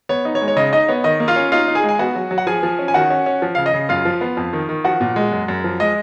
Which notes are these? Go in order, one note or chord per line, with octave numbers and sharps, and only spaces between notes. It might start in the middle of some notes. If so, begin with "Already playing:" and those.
B3 C#5
D#4
C#5
G#3
C#5
C#3 D#5
D#4 D#5
B3 C#5
D#3 D#5
A#3
F4 F5
C#4
D#4 F4 F5
D#4
G#4 G#5
G#3
G#5
B3 F#4 F#5
F#3
F#3
F#5
F3 G#4 G#5
F3
C#4
G#5
D#3 F#4 F#5
C#4
C#4
F3
C#3 F5
D#5
C#3
F#2 F4 F5
F3
B3
F2
D#3
D#3
F3 F#4 F#5
A#2
G#3
F#2
F#2
F3
G#3 D#5